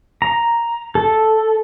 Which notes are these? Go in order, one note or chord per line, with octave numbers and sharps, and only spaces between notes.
A#5
A4